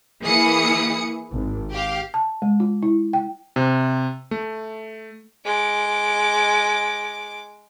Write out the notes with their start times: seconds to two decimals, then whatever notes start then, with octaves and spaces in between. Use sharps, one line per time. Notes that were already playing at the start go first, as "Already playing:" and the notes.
0.21 E3 A#3 E4 G#4 D#6 C#7
1.31 G#1
1.72 G4 F5
2.14 A5
2.42 G#3
2.60 F4
2.83 E4
3.13 G5
3.56 C3
4.31 A3
5.45 G#3 D6